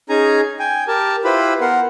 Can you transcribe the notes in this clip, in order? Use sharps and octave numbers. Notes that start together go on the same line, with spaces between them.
C#4 D#4 G#4 G#5 A#5
G5 G#5
G4 A#4 A5
E4 F4 G4 B4 C5 B5
B3 A#4 F#5 C6